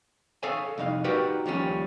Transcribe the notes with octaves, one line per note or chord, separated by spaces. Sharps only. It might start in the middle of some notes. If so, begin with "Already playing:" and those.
G#4 A4 C#5 E5 F5 G#5
C2 F2 D#4 F5
D#4 F#4 G4 A#4 B4 D5
D#2 F3 G3 C#4